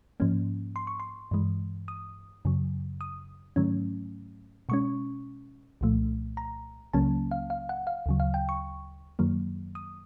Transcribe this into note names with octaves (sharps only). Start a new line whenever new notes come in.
G#2 F3 A#3 C#4
C6
C#6
C6
G2 E3 G#3
D#6
F#2 C#3 F#3
D#6
G#2 D#3 F#3 A3 C#4
B2 G#3 C#4 C#6
C2 A#2 F3 A3
A#5
C#2 C#3 F#3 A#3 C#4 A5
F5
F5
F#5
F5
D2 C#3 F#3
F5
G5
C#6
F#2 D#3 F#3 A#3
D#6